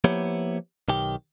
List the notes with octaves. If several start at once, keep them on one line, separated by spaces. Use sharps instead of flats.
F3 A#3 B3 E4 G4 C#5
B1 D#3 G4 G5